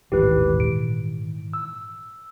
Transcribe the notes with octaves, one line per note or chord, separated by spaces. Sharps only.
D#1 A1 G#2 D#3 E3 G#3 G4 B4
A#2 D7
E6